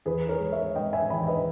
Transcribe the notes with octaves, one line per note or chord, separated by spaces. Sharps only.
E2 G#4 B4
A#4 C#5
G#3
C#5 E5
G#3 D#5 G5
E5 G#5
E2 G#5 B5
B4 D#5